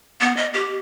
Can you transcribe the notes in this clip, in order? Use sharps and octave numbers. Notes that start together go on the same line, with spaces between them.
B3
D#5
G4